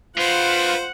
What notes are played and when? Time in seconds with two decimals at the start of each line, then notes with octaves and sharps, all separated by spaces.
0.17 F4 B4 C5 F5 F#5